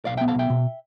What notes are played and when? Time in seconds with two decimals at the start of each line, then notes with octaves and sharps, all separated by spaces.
0.05 B1 D5 F5
0.17 E5 G5
0.21 B3
0.28 F5 A5
0.35 B1 E5 G5
0.50 B2